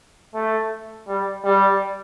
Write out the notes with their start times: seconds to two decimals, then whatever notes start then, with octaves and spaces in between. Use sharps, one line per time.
0.34 A3
1.08 G3
1.45 G3